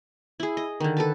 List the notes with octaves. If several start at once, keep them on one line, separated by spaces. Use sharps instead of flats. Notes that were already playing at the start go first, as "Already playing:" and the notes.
E4 G#4
D#5
D3 D#3
A4 B4 A5